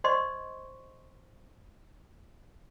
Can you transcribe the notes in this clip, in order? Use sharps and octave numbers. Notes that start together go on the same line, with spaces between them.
C5 D5 D#5 C6 C#6